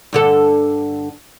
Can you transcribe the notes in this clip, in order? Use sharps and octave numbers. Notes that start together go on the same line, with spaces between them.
G2 D3 A4